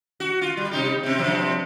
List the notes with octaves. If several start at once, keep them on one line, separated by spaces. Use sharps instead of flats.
F#4
F4
G3
C3 D#4 G4
C3 C4
G2 C3 F3